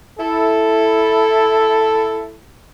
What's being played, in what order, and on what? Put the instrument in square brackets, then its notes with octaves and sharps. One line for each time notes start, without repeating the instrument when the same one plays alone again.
[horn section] E4 A4